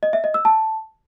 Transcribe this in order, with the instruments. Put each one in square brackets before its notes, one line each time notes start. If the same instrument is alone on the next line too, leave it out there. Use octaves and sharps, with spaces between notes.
[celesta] D#5
E5
D#5
E6
A5